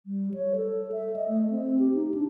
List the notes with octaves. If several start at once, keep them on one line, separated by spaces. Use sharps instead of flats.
G3
C#5
A4
E5
D#5
A3
C4
G4
D#4
D4